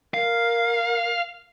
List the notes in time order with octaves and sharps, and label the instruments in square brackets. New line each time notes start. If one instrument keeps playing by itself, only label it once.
[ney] A#4 [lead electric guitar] F5